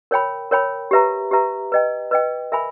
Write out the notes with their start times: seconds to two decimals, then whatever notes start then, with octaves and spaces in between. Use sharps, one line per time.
0.11 A#4 C#5 G5 B5
0.51 A#4 C#5 G5 B5
0.91 G4 B4 E5 A#5
1.31 G4 B4 E5 A#5
1.72 B4 D#5 G5
2.11 B4 D#5 G5
2.52 A#4 E5 G#5 B5